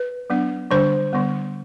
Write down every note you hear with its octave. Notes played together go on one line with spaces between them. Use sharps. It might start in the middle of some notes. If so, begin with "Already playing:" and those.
Already playing: B4
F#3 B3 D4
D3 G3 D4 C5
D3 G3 B3